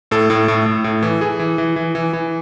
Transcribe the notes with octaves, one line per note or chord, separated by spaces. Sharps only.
A2 A4
A2
A2
A2
A2
E3
E3 G#4
E3
E3
E3
E3
E3